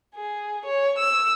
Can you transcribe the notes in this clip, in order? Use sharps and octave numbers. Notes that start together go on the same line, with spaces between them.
G#4
C#5
E6